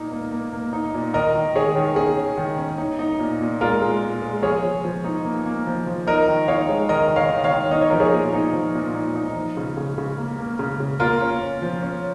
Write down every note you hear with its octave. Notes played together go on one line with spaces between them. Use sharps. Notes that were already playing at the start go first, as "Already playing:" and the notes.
Already playing: A#2 A#3 D#4
A#3
A#3
A#3
D#4
A#2
D#3 A#4 D#5
D#3
D#3 G#4 C#5
D#3
C#4 G#4
C#4
D#3
C#4
D#4
D#4
A#2
A#2
G#3 F4 A#4
G#3
A#2
G#3
F3 G#4 C#5
F3
F3
D#4
A#3
A#3
F3
F3
D#4 A#4 D#5
D#3
D#4 C#5 F5
G#3
D#3 A#4 D#5
D#3
C#5 F5
D#3
C#5 F5
D#3
D#4 D#5
C#5
F3 A#4
G#4 C#5
A#2
D#4
F3
A#2
D#4
D#4
F3
C#3
C#3
C#3
A#3
A#3
C#3
C#3
A#3 F4 A#4
C#4
C#4
F3
C#4